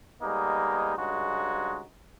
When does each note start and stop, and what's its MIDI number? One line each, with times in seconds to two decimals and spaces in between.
0.22 0.94 55
0.22 0.94 56
0.22 0.94 58
0.22 0.94 59
0.22 0.94 63
0.96 1.83 43
0.96 1.83 49
0.96 1.83 56
0.96 1.83 63
0.96 1.83 66